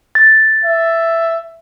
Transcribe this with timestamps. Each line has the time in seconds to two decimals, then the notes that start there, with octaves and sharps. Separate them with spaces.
0.15 A6
0.65 E5